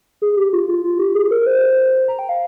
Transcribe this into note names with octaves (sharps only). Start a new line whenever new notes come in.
G#4
G4
F4
F4
F4
G4
G#4
A#4
C5
A#5
G5
F5